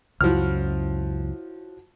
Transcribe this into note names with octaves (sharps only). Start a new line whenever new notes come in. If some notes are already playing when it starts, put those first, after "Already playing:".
C#2 F#2 F3 E4 F#4 C#5 F6